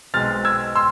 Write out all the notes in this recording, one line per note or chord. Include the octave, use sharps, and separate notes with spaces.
B1 B2 G#3 C4 F6 A6
E6 G#6
C6 E6